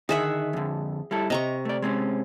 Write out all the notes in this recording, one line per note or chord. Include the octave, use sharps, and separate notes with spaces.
D3 D#3 D#4 G#4 E5 F#5
F2 D3
G3 E4 A4
C3 D#5 A#5 C#6
A3 D5
G#3 C4 C#4